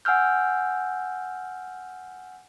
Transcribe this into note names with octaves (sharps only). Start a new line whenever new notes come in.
F#5 G#5 E6 F6 G6